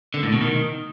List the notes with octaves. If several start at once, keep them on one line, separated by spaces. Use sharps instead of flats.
D3
A2
B2
D#3